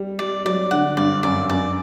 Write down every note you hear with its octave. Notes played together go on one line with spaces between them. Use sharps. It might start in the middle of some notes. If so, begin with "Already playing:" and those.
Already playing: G3
G3 D5
F#3 D5
D3 F#5
G2 D5
F#2 D5
F#2 D5